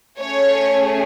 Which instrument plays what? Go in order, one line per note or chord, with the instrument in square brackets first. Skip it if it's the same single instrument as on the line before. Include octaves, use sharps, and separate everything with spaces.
[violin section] A3 C#4 G#4 C#5